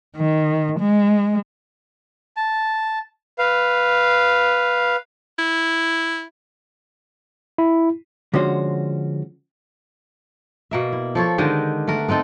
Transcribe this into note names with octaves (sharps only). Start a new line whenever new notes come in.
D#3
G#3
A5
B4 F5
E4
E4
D3 F3 G#3 C#4 F#4 C5
B2 A#3 E5
E4
F3 A4 C#5
D3 D#3 G#3 G4
A3 B3 A#4
B3 C4 D#4 A4